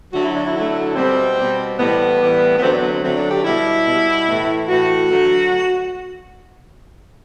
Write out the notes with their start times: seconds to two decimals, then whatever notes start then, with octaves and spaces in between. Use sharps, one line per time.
0.13 D3 F#3 A3 F#4
0.24 E4
0.35 D4
0.46 E4
0.55 D3 F#3 A3
0.96 B2 G3 C4
1.37 B2 G3
1.79 A2 E3 G3 B3
2.20 A2 E3 G3
2.57 B3
2.61 D3 F#3 A3 C4
2.72 D4
2.82 B3
2.92 C4
3.03 D3 F#3 A3 C4
3.16 D4
3.30 G4
3.44 B2 G3 E4
3.85 B2 G3
4.26 A2 E3 A3
4.68 A2 E3 A3 F#4
5.09 D3 F#3 A3